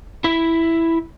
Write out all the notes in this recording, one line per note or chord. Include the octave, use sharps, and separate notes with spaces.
E4 E5